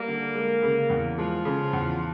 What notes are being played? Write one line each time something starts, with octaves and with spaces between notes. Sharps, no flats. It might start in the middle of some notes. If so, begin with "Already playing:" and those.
Already playing: G3 A#3
D3
G#3
C#3
E2
F3 G#3
C#3
E2